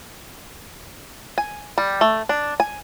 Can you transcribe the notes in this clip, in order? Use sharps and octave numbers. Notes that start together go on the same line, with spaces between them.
G#5
G3
A3
D4
G#5